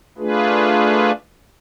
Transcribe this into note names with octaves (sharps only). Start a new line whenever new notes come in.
A3 D4 F4 G#4 B4